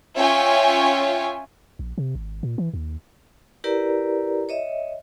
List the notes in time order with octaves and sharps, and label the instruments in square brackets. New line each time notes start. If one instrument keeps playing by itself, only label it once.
[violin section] C#4 F4 C#5 E5 G5 G#5
[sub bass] A#1
C3
G#1
A#2
E3
D#2
[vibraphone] E4 G4 A#4 B4 D5 A#5
C#5 D#5 E5